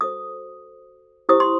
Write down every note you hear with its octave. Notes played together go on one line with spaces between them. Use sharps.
F#4 A4 C5 D#6
E4 G4 C5 D#6
C6